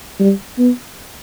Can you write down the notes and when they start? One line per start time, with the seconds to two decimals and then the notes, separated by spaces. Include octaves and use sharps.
0.20 G3
0.59 B3